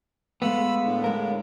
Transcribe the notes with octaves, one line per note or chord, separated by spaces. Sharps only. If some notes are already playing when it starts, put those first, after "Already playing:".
G#3 A3 B3 F5 B5 E6
A2 D3
G#3 A#4